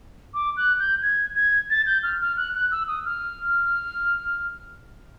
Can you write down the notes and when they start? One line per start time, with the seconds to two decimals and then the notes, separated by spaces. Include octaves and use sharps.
0.34 D6
0.56 F#6
0.79 G6
1.02 G#6
1.35 G#6
1.70 A6
1.86 G6
2.03 F6
2.20 F6
2.36 F#6
2.54 F#6
2.71 E6
2.87 D#6
3.05 F6